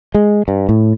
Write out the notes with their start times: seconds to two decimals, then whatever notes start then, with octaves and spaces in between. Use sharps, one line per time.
0.14 G#3
0.48 G2
0.69 A2